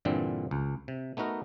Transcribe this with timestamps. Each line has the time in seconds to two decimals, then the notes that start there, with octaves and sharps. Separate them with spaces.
0.05 G2 A#2 D3 E3 C4
0.51 C#2
0.88 C3
1.17 A3 B3 D#4 F#4 A#4